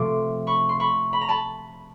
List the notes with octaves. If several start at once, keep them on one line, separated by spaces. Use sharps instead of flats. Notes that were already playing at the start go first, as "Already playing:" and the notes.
Already playing: C3 F3 A3 C6 D6
B5 C#6
C6
B5 C#6
B5
A#5
A5 B5